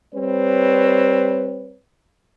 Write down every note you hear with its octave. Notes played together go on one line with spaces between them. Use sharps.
G3 C4 B4 C#5